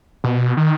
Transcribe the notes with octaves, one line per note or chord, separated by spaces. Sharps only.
B2
D#3